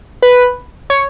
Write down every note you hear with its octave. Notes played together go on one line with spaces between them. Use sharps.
B4
C#5